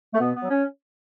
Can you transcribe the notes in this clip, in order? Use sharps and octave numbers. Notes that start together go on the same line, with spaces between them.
A3
B2 B3
B3
F#3
C#4